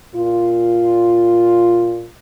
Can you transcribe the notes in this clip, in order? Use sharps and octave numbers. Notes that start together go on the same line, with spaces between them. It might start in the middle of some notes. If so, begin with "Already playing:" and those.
A#2 F4